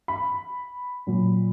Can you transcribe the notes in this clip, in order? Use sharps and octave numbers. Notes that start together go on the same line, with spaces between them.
B5
A#2 F#3